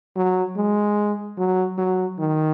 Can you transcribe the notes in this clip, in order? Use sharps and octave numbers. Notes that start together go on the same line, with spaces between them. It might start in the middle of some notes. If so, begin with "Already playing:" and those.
F#3
G#3
F#3
F#3
D#3